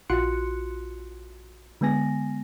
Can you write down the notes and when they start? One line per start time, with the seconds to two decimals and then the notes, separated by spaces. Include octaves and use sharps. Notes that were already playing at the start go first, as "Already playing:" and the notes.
0.10 A#1 F4 F#4 C6 F#6 C#7
1.81 D3 G#3 B3 G#5 A#6